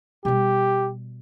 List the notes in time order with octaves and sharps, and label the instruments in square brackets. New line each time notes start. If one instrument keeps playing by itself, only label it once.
[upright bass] B2 G3 [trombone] G4